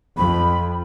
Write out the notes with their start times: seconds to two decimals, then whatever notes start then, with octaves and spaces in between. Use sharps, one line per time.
0.17 F2 B5